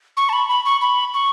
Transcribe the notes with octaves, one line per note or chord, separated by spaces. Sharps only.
C#6
A5
B5
B5
C#6
B5
C#6